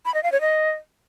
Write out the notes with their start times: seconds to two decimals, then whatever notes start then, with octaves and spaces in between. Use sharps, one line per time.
0.05 B5
0.14 D#5
0.23 F5
0.32 C#5
0.41 D#5